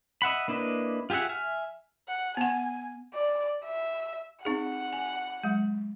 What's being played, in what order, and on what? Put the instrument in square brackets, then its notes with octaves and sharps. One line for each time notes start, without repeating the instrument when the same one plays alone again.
[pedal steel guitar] D#5 E5 F#5 B5
A#3 D4 E4 B4 D#5
F4 G4 G#4 E5 F#5
E5 G#5 F6
[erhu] F#5
[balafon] B3 F#5 [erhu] G#5
[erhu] D5
E5
[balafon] C4 D#4 G#4 [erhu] F#5
[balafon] G#5
F#3 G#3